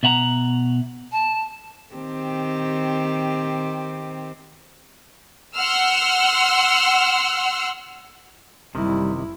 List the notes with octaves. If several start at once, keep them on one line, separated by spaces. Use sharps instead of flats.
B2 E5 F#5 A#5
A5
D#3 C4 G4
F#5 C6 E6 F6
F#1 C3 D#3 G3 E4